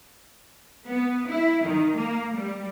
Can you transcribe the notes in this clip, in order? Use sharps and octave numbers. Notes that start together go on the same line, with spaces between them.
B3
E4
D#3
A#3
G3